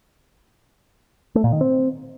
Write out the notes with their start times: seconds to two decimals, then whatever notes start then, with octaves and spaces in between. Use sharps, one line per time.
1.35 A3
1.44 A#2
1.52 D#3
1.61 C4